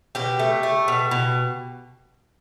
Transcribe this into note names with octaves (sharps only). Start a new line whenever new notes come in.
B2 G4
A3
A3
B2
B2